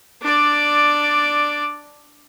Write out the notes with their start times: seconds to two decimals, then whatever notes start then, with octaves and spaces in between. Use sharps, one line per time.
0.22 D4 D5